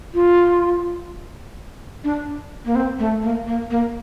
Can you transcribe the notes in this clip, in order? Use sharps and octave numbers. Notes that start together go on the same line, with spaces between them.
F4
D4
A#3
C4
A3
A#3
A#3
A#3